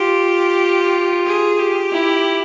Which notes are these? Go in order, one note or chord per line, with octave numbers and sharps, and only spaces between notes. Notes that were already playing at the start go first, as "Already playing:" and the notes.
Already playing: F4 G4
G#4
G4
E4